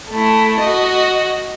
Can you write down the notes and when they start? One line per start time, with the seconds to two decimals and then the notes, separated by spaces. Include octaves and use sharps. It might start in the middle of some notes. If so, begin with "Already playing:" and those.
0.11 A3 E4
0.61 F#4 D#5